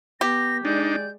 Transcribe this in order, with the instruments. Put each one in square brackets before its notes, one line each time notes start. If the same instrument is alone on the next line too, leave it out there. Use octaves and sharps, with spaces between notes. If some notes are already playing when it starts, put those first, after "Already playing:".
[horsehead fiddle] B3 [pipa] G4 [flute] A#6
[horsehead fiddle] G#3 D5 [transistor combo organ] D4 D#4 [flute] G6